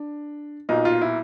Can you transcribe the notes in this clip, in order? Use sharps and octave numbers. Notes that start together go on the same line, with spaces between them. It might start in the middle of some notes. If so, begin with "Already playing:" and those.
Already playing: D4
B1 A#2 D#4
F4
E4